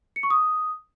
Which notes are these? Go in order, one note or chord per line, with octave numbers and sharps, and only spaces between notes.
C#7
C#6
D#6